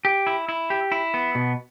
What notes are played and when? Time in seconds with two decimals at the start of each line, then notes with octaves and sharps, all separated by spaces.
0.05 G4
0.27 E4
0.49 E4
0.70 G4
0.92 E4
1.14 B3
1.35 B2